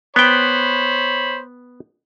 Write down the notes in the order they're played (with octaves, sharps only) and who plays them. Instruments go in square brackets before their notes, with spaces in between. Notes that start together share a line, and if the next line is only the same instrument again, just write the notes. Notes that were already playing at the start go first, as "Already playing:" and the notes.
[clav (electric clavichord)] B3 G5 [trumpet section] C5 C#5 B5